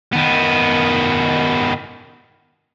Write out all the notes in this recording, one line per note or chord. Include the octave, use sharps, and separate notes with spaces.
D#3 B3